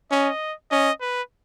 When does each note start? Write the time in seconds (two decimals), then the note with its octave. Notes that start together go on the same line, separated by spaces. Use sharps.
0.11 C#4 D#5
0.71 C#4 D#5
1.01 B4